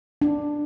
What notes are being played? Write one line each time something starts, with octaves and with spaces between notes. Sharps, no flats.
D4